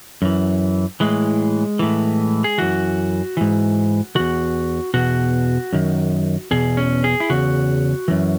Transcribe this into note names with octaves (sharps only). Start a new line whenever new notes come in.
F#2 E3
A2 E3 G#3
A2 E3
G#4
F#2 E3 F#4
G#2 E3
E2 D#3 F#4
E2 B2 F#4
F#2 D#3
E2 B2 G#4
C#4
G#4
E4
E2 C#3 F#4
F#2 E3